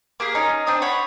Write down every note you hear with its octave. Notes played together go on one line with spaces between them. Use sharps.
A#3 G4 G#4
C#4 D#4 A#4
C4 D4 D#6
C#5 F#5 B5